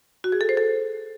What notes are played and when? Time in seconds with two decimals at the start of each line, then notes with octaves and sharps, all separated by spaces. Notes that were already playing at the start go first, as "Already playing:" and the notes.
0.24 F#4
0.32 G#4
0.41 A4
0.49 C5
0.57 A4